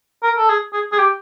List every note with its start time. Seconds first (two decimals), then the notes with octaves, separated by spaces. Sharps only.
0.23 A#4
0.38 A4
0.49 G#4
0.73 G#4
0.92 G#4
0.98 G4